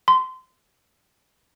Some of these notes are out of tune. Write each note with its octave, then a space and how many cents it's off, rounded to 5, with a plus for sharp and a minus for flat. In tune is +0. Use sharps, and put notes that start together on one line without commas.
C6 -25